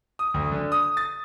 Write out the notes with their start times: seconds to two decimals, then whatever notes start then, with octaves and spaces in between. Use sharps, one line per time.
0.19 D#6
0.34 D2
0.52 D3
0.72 D#6
0.97 A6